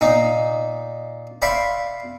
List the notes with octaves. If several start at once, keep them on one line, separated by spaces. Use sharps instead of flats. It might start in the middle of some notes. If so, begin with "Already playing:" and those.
A#2 D#4
C5 D5 E5 F5 B5 C#6